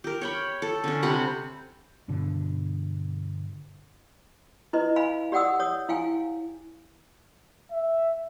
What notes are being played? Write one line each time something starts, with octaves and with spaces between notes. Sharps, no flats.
G4 A#4
C#5 G5 B5
A4
D3 C#4
C3 G3 F#5 B5
G2 B2 D3
E4 B4 D#5
F5 G#5 B5
G4 D5 F#5 G5 D#6 E6
C#5 D#6
E4 F5 G5 G#5
E5